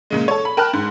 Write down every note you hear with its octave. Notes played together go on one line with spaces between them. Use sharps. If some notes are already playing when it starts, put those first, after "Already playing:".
A#2 C#3 G#3
A4 C#5
B5
A#4 G5 A5 B5 F6 F#6
G#2